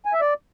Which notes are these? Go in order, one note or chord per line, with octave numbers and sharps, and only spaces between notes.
G#5
E5
D5